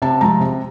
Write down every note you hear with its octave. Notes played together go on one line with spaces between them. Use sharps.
C3 A5
F3 G#3 A#5
C3